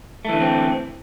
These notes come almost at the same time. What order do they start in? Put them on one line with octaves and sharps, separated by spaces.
A3 E3 D3 B3 C4